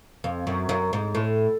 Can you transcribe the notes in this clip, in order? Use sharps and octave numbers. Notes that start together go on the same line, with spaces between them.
F2
F#2
F#2
G#2
A2